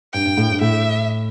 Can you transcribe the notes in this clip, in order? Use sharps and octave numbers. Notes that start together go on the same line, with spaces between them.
G2 G5
G2
A2
G2
A2 E5